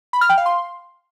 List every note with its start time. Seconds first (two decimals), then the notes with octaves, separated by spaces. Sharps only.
0.13 B5
0.21 F6
0.29 G5
0.38 F5
0.46 C6